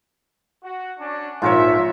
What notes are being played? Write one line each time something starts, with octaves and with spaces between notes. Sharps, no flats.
F#4
C#4 D4
A#1 G#2 F4 A#4 C#5 E5